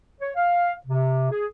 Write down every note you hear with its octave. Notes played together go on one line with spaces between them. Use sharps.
C#5
F5
C3
G#4